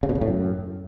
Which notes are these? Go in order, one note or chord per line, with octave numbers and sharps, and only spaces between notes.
C#3
B2
C#3
A2
F#2